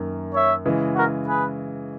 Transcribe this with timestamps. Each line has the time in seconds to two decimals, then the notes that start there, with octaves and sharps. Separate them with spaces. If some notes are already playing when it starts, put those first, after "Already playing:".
Already playing: F#2 D#3 A#3
0.34 C#5 E5
0.65 C#3 E3 G#3
0.95 F#4 A#4
1.26 G#4 B4